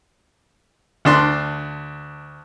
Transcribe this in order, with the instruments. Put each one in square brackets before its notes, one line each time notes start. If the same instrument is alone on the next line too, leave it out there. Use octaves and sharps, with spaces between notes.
[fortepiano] D2 D4 C6